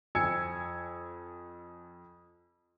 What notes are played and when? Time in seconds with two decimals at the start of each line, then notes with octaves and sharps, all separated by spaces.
0.15 F2 G#5 E6 G#6 C#7